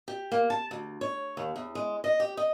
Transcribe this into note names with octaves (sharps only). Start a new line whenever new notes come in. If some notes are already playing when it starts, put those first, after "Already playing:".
G4
A#3
A5
D2
C#5
D#2
E2
G#3
D#5
G4
D#5